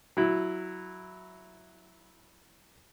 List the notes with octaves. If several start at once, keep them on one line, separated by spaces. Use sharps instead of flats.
F#3 E4